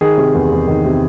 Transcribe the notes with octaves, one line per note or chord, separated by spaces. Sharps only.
D#3 G#4
C3
E2
E2
D#3
C3